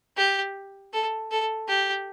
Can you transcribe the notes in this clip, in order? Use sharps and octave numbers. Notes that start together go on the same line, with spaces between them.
G4
A4
A4
G4